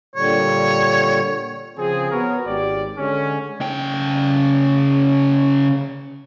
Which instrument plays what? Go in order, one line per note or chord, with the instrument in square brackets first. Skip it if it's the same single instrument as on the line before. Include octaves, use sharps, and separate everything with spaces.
[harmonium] A#2 D3 G3 [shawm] C#5
[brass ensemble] C#3 F3 C4 G#4
B3 F#4 A#4 C#5
G#1 G4 D5
D3 G#3 C#4
[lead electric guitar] C#3 G5